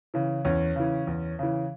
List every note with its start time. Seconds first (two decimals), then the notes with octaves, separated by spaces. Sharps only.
0.14 C#3 E3
0.45 E2 C#4
0.76 C#3 E3
1.07 E2
1.39 C#3 E3